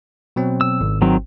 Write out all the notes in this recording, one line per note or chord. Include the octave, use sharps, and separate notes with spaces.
B2 F#3 C4
E6
G#1
D#3 F#3 C4